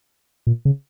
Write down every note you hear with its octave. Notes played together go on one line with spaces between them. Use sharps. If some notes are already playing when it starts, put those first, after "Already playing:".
A#2
C#3